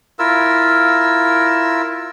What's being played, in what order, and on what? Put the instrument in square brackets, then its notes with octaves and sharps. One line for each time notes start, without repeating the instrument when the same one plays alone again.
[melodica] E4 F4 A#4 E6